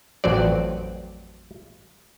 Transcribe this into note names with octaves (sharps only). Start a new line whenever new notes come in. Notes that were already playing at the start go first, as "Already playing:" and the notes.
A1 F2 F#3 C4 D5